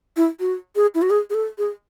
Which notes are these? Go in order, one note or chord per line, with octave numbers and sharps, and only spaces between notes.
E4
F#4
G#4
E4
F#4
G#4
G#4
A4
G#4